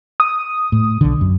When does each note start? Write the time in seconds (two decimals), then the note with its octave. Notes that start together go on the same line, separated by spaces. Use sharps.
0.20 D#6
0.72 A2
1.01 B1 D3
1.21 F#2